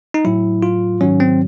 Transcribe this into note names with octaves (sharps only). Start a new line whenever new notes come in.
D#4
A2 F#3 E4
F4
G#2 D#3 F#3 C#4
C4